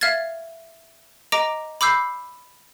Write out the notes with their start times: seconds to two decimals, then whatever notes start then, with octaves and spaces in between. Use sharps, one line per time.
0.01 E5 F5 F6 G#6 A6
1.32 D#5 A#5 D6 A#6 D7
1.81 B5 D6 E6 G6 C7